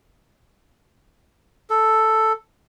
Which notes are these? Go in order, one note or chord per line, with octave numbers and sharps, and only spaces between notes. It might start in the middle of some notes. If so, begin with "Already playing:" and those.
A4